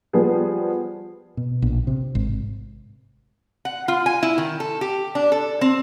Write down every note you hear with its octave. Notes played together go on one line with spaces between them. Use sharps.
F3 G3 B3 G#4
B2
A#1
C3
G#1
F#5
F4
G#5
E4
D#3
A4
G4
D4
A4
C4